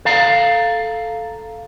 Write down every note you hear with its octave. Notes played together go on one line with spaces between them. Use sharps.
A4 F5 A#5